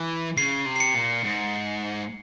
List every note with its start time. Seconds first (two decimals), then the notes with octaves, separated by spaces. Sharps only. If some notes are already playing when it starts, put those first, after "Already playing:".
Already playing: E3
0.37 C#3 C7
0.66 C3
0.76 C7
0.80 C#7
0.95 A#2
1.24 G#2